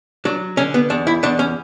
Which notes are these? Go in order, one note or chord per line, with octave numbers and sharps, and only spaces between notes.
F#3 D4
D3 C#4
B3
E2 D4
E4
E2 D4
C#4